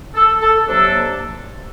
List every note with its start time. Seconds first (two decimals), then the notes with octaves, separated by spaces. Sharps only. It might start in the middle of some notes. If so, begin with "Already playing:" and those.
0.15 A4
0.41 A4
0.67 C3 F#3 A#3 D4 A4